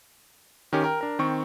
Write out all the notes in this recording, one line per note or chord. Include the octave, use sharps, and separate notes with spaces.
D#3 C#4 G4
A#4 G5
D4 A#4
D#3 C4 C#6